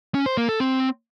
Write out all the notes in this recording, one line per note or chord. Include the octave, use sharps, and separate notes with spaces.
C#4
C5
A#3
A4
C4